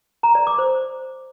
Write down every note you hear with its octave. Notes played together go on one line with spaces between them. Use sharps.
A#5
D5
D6
C5